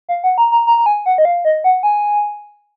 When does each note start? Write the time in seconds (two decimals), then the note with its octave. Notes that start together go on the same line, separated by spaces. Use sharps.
0.09 F5
0.24 F#5
0.38 A#5
0.52 A#5
0.67 A#5
0.78 A#5
0.86 G#5
1.06 F#5
1.18 D#5
1.25 F5
1.45 D#5
1.64 F#5
1.83 G#5